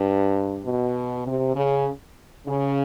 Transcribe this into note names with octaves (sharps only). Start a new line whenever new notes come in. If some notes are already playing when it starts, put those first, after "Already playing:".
Already playing: G2
B2
C3
C#3
C#3